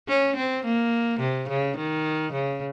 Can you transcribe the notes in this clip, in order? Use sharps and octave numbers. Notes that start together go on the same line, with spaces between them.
C#4
C4
A#3
C3
C#3
D#3
C#3